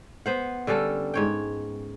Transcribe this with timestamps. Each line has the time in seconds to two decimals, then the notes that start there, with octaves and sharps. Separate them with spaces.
0.26 B3 C5 F#5
0.67 D3 G3 C#4 A4
1.14 G#2 C#5 G5